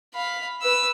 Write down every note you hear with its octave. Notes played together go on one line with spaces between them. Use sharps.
F5 B5
B4 E6